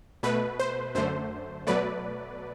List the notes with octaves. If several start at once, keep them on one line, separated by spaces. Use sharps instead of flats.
B2 A3 B4
C5
F#2 D3 A3 C5
B2 F#3 A3 B4 D5